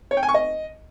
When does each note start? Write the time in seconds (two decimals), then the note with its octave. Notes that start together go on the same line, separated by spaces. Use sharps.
0.11 C#5
0.17 G5
0.23 G#5
0.29 C#6
0.34 D#5